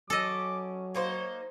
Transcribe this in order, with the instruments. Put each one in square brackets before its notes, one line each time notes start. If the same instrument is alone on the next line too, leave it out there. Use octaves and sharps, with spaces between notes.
[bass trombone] F#3 [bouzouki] C#4 [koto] A4 D#5 [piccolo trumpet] D6
[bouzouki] A#3 D#4 C5 [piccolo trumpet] C#5